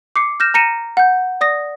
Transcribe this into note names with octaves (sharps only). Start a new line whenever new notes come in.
D6 C7 C#7
F6 G6 A#6 E7
A#5 A#6 C#7 D#7 E7
F#5 G6
D5 D#6 A#6